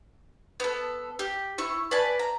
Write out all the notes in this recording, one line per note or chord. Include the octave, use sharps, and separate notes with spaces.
B3 A4
G4
E4 C#6
B4 D5 G#5 A5
A#5